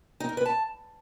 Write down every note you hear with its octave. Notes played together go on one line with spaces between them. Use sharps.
D#4
A#4
B4
A5